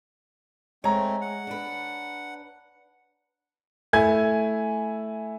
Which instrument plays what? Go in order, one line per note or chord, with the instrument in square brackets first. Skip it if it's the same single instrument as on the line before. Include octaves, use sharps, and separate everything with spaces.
[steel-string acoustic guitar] G#3 [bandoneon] A3 C4 [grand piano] C#5 A#5
[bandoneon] F#5
[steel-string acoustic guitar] D4 B4
[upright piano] A3 E4 G#5 G#6